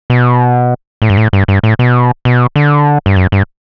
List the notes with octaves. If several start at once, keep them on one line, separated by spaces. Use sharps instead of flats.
B2
A2
G2
A2
G2
G2
A2
B2
B2
D3
G2
F#2
G2